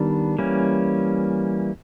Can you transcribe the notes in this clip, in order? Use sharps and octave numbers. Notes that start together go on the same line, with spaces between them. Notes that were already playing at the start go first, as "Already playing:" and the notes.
Already playing: D#3 G3 B3 D4
E3 G3 A#3 C#4